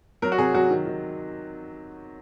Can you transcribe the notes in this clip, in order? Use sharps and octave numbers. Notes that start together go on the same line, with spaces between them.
F#3 A#4
F#4
C3 G#4
F#3 F#4
D#3
D#3